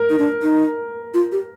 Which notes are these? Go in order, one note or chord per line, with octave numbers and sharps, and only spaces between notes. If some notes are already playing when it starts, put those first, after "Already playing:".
Already playing: A#4
D#4
D4
D#4
F4
G4